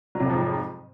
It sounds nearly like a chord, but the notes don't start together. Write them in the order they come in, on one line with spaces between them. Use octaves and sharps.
F#3 C3 F2 F3 G#2